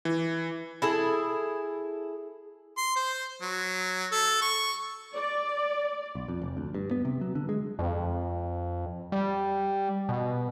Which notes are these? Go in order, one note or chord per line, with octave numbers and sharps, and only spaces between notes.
E3
E4 G#4 A4
C6
C5
F#3
A4
C#6
D5
B1
F2
F1
D2
G2
B3
C3
F#3
D3
G#3
F2
G3
B2